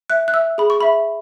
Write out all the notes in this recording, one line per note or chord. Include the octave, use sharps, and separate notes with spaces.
E5 F#6
F#6
E5 E6
G#4 B5
C#6
E5 B5